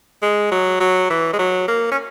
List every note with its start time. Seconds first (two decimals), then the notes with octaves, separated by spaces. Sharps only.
0.22 G#3
0.52 F#3
0.80 F#3
1.10 E3
1.33 G#3
1.39 F#3
1.68 A#3
1.92 C#4